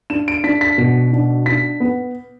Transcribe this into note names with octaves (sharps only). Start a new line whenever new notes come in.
D4 E7
D7
D4 B6
B6
B2
D4
D4 B6
B3